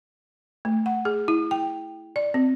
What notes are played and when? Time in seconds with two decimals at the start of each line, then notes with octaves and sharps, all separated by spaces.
0.65 A3
0.86 F#5
1.05 G#4
1.28 E4
1.51 G5
2.16 D5
2.34 C4